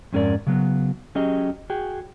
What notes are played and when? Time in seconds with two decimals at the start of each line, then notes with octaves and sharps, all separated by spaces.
0.13 F2 G#2 C#4 F#4 A#4 D5
0.47 C#3 F#3 B3
1.15 F#3 C#4 G4 G#4 D#5
1.70 F#4 G#4 G5